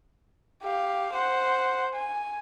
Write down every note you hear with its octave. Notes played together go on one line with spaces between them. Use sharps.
G4 F5
C5 F#5
G#5